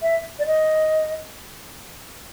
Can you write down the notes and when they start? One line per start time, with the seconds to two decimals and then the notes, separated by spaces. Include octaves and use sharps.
0.02 E5
0.39 D5
0.46 D#5